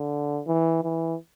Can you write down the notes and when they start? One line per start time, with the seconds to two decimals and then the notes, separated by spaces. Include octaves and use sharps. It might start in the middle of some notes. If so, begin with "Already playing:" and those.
Already playing: D3
0.47 E3
0.84 E3